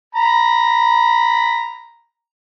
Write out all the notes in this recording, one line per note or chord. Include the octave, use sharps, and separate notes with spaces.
A#5 B5